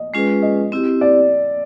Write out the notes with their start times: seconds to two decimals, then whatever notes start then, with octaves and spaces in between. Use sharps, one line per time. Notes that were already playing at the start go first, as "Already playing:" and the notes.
Already playing: D#5
0.14 G#3 C#4 F4 G#4 B4
0.42 D#5
0.72 C4 E4 G4
1.01 D5